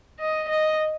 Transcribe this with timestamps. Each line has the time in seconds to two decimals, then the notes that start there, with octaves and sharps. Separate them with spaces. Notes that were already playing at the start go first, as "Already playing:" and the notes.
0.20 D#5
0.49 D#5